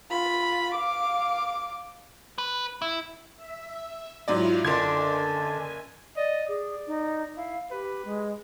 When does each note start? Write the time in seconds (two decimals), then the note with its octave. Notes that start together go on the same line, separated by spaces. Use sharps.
0.10 F4 B5
0.75 F5 D6
2.38 B4
2.82 E4
3.36 E5
4.28 G#2 F#3 E4 F4 D5 F5
4.65 F#1 D3 D4 G#5 C6 G#6
6.16 D5 D#5
6.48 G#4 D5
6.87 D#4
7.37 E4 F5
7.71 G4 B4
8.05 G#3